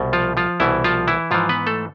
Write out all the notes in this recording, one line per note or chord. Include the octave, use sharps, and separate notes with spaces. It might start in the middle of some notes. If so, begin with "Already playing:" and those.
Already playing: C2 B2
F3 F4
F3 F4
C2 B2 E3 E4
F3 F4
E3 E4
G#2 E3 F3 F4
B3 B4
A3 A4